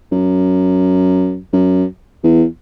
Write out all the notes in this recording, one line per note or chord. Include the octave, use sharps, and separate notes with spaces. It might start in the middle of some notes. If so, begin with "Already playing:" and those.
F#2
F#2
E2